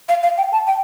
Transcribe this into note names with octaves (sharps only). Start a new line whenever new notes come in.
F5
F5
G5
A5
G5